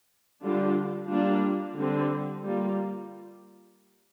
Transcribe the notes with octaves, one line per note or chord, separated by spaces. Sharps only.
D3 G3 D4 F4
G3 A#3 D4 F4
D3 G3 C4
G3 A#3 F4